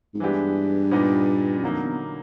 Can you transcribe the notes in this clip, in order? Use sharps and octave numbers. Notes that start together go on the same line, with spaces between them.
G#2
G2 E3 G#3 B3 D4 G4
A#2 G3 B3 D#4
F#2
F2 D3 F#3 A#3 D#4
E2